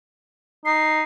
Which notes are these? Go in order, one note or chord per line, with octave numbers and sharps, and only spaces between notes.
D#4 C7